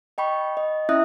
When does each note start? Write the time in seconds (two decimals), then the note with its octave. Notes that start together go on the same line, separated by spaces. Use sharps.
0.18 D#5 G5 B5 C#6
0.57 D#5
0.89 C#4 E4 E5 D#6 F#6